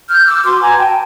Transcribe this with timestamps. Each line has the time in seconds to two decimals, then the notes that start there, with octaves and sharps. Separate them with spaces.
0.09 F6 G6
0.21 F6
0.26 D6 E6
0.44 F#4 B4 C6 D6
0.61 G#5 A#5
0.78 G5 A5